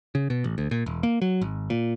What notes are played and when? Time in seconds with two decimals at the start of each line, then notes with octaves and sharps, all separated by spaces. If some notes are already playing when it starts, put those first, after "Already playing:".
0.15 C#3
0.30 B2
0.44 A1
0.58 D2
0.71 A#2
0.86 E1
1.03 A#3
1.22 F#3
1.41 G#1
1.70 A#2